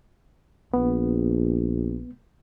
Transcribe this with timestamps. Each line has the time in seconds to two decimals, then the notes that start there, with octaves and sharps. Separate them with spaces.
0.74 A#1 B3